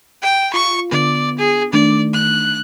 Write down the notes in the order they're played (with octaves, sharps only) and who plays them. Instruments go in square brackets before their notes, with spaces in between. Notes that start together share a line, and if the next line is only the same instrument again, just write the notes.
[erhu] G5
[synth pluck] F4 [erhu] C#6
[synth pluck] D3 B3 [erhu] D5
[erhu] G#4
[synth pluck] D#3 A3 D4 [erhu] D5
[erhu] F#6